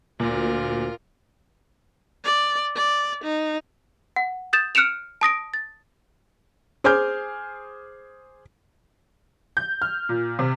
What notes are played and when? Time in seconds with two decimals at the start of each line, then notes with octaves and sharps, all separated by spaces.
0.20 D2 A#2 F4 A#4
2.25 D5
2.76 D5
3.24 D#4
4.16 F#5
4.53 D#6 G6 A6 E7
4.75 F6 F#6 C#7 D7 E7 F7
5.21 A5 D#6 A#6 D7
5.54 A6
6.84 G#4 C5 G#5 D6 F6 G6
9.57 G6
9.82 F6
10.09 A#2
10.39 C3